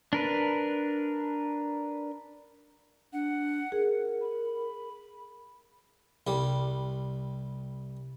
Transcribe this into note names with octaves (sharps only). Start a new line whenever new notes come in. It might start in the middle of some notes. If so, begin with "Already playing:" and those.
D4 A#4 B4
D4 F#5
G#4 A#4
B5
C2 G3